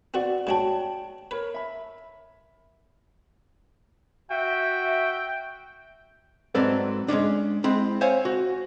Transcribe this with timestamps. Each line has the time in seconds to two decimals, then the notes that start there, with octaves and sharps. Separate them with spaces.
0.14 C4 F#4 B4 D5 F#5
0.47 G#2 D4 F#4 C#5 G5 A5
1.31 A#4 B4 C#5
1.54 E5 B5
4.31 F#4 E5 G5
6.55 G#2 F#3 C4 A4 B4 D5
7.08 G#3 A#3 C#4 D4
7.64 G#3 C4 E4
8.01 C5 C#5 E5 F5 G#5
8.25 F#4